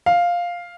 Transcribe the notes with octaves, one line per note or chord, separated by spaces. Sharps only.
F5